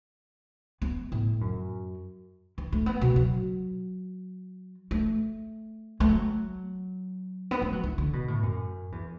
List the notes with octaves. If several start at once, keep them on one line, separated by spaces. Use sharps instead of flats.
B3
A2
F#2
E3
A3
B3
B2
F#3
A3
A3
F#3
B3
A3
F#3
E3
D3
B2
A2
F#2
E2